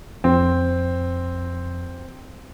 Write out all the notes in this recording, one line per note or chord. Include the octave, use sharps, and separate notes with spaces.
F2 C4